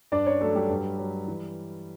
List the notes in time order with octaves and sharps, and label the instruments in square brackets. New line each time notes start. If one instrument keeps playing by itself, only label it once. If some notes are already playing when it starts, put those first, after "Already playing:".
[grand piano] G2 D4 D5
C#4 C#5
F#3 A3 A4
G3 G4
G2
F#3
E3